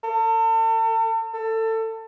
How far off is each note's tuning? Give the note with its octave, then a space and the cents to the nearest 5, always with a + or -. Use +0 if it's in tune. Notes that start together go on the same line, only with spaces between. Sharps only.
A4 +40
A4 +25